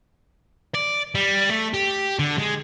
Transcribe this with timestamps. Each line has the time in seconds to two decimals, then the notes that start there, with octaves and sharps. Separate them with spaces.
0.75 D5
1.15 G3
1.50 A3
1.74 G4
2.19 D3
2.39 G#3